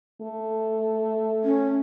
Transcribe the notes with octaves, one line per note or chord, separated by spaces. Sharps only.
A3
C#4